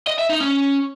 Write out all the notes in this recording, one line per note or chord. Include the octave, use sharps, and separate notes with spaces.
D#5
E5
D#4
C#4